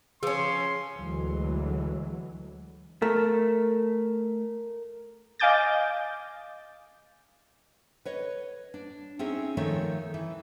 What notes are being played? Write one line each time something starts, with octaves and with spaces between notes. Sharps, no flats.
F3 C#4 G#4 C6
D2 E3 F#3 G#3
A3 A#4
D#5 F5 G#5 D6 G6 A6
B4 C#5 D#5
D4
C4 C#4 D#4 G#4 E5
D#3 F3 A3 C#5 E5
E3